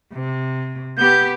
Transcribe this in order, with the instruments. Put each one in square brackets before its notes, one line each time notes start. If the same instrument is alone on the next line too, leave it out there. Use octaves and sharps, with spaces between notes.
[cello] C3
[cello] B3 G4 [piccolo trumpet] G6